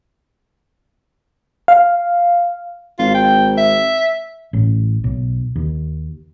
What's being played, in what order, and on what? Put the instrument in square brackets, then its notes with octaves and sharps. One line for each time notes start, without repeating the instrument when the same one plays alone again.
[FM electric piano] F5
[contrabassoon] G#1 [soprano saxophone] F4
[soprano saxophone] G5
E5
[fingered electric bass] A1
B1
D#2